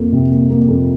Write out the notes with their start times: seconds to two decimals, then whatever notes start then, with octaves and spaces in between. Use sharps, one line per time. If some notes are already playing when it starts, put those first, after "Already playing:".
Already playing: F2 A#3
0.12 C3
0.31 A#3
0.50 A#3
0.68 F2